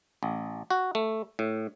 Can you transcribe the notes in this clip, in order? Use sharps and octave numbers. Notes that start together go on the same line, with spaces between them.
A1
F#4
A3
A2